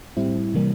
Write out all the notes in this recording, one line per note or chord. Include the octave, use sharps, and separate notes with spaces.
A2 G3 C4 E4
C3 E3 G3 A#3